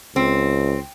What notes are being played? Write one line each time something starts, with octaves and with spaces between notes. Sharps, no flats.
C#2 C4